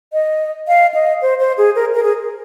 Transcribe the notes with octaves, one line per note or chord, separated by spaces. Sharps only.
D#5
F5
D#5
C5
C5
G#4
A#4
A#4
G#4